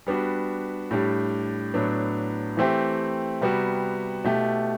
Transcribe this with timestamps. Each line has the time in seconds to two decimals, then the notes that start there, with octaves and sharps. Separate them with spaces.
0.07 G3 B3 D4 F#4
0.91 A2 G3 D4 G4
1.74 A2 F#3 B3 D4
2.57 E3 A3 C4 E4 G4
3.41 C3 G3 B3 F#4
4.24 B2 A3 E4 G4